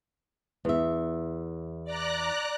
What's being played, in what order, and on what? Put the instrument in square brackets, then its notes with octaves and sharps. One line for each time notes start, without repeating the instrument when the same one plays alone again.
[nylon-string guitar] E2 E5
[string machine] D5 A#5 F#6